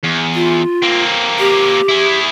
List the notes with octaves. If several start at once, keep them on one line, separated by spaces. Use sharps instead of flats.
E2
F4
A#3 C4
G4
E4 G#4